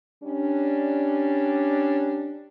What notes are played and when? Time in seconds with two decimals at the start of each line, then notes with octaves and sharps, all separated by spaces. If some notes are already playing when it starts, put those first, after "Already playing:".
0.24 G3 C#4 D4